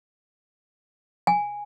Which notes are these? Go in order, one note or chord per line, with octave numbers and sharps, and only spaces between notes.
G#5